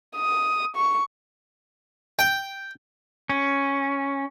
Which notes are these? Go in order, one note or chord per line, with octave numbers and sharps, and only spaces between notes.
D#6
C#6
G5
C#4